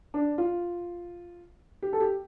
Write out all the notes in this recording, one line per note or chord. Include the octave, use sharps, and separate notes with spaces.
D4
F4
G4
A4
G4